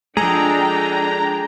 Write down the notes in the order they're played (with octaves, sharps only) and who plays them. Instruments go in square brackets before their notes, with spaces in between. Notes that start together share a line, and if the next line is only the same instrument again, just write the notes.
[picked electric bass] F3 G#3 [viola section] D4 G5 [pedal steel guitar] G#4 A4 D#5 [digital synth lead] A#5